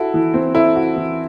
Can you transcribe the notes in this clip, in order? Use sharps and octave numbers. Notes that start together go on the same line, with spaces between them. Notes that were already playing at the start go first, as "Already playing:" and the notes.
Already playing: E4 F#4 A4
E3
C4
E4 A4
F#4
E3